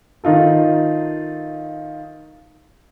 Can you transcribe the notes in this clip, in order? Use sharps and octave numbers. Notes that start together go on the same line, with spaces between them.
D#3 D#4 F4 A4